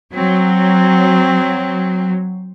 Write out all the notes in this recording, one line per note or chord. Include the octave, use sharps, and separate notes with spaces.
F#3 C4